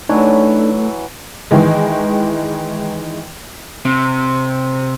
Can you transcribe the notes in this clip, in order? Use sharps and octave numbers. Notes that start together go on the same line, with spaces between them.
E3 F#3 A3 D4 D#4 C#5
D#3 E3 G#3
C3